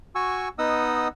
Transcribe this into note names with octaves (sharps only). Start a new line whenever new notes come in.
F#4 G#5 C#6 E6
B3 D#4 D#5 F#5 D#6 E6